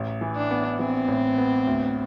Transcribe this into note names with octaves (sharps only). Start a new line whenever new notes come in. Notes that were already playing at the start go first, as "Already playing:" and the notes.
Already playing: A1
E3
D4
B3
E3 C4
A1
B3
D2